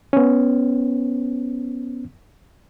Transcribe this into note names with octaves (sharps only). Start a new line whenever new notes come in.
B3 C#4